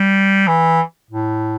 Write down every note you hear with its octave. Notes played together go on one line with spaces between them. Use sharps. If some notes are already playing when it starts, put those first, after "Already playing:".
Already playing: G3
E3
A2